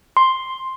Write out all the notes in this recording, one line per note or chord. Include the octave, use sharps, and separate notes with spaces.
C6